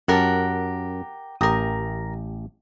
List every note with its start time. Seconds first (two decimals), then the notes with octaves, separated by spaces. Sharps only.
0.08 F#2 G4 A#4 F#5 A5
1.41 A1 G4 A#4 A#5 D#6